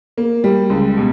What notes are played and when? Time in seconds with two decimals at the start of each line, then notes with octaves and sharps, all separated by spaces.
0.17 A#3
0.44 G3
0.70 C#2
0.97 B2